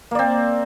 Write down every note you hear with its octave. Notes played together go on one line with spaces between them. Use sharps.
A#3 C4 D5